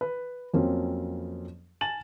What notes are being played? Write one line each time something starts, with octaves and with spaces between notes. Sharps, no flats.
B4
F2 F3 F#3 A#3 C4 C#4
G#5 A5 A6 E7 F#7